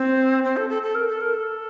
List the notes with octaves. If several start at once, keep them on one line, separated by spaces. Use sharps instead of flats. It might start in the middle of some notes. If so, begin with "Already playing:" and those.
Already playing: C4
C4
A4
A4
A4
A#4
A4
A#4
A4